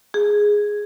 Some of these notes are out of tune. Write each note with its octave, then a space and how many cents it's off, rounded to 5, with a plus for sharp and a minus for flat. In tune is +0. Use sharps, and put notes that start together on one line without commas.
G#4 +0